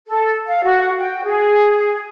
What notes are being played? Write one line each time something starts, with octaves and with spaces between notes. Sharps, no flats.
A4
F5
F#4
G5
G#4